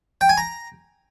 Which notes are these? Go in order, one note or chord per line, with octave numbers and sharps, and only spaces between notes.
G5
G#5
A#5